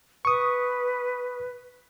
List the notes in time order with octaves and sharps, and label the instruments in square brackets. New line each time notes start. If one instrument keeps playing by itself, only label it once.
[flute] B4 [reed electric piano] C#6 D#6